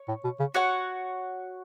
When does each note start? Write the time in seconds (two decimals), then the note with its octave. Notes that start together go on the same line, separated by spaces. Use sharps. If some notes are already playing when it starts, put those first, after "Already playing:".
Already playing: C#5
0.08 A2
0.24 B2
0.39 C#3
0.54 F#4 C#5 F#5